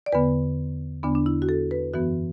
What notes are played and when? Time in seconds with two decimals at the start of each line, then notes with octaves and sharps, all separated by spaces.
0.06 D5
0.12 E2 D3 B3 B4
1.03 E2 D3 B3 D4
1.15 D4
1.26 E4
1.42 F#4
1.49 A4
1.71 B4
1.94 F#2 E3 B3 F#4